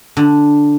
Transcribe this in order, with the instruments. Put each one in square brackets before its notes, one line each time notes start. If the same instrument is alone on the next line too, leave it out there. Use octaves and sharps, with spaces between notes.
[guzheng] D3